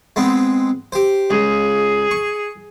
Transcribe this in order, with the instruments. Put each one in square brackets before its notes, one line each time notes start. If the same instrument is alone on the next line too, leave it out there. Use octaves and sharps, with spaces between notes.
[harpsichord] G#3 B3 C4
G4 C5
[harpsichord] C#2 [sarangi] G#4
[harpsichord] C#6